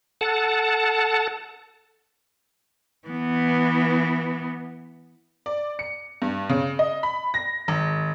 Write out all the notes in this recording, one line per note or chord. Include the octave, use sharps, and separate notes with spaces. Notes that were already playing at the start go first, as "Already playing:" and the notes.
A4 F#5 A5
E3 B3
D5
C#7
G2
C#3
D#5
B5
A#6
G#1